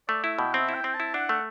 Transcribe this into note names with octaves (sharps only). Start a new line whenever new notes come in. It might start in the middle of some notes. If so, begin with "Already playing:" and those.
A3 D5
E4 E5
B2 G5
C4 E5
E4
G5
C4
A5
E4
D4 F#5
A3